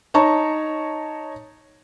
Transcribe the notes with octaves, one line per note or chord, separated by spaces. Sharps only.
D#4 C#5 A5 A#5 C#6